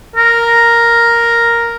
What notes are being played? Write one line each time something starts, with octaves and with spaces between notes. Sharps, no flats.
A#4